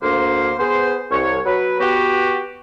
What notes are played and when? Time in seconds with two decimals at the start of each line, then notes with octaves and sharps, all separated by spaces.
0.02 D2 A#3 C5
0.59 B3 G#4 B4 C5
1.11 C2 C#5
1.46 F#3 B4
1.80 B3 F#4 G4